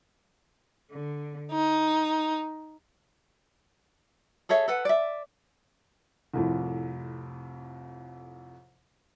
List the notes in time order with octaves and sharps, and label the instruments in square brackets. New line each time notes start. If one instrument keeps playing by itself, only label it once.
[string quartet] D3
D#4
[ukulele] G#4 A4 C#5 E5
A4 B4 F#5
D5 E5
[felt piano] C2 F2 A2